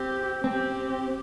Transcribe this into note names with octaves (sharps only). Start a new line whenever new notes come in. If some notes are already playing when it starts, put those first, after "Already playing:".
Already playing: C4 G4
C4 G4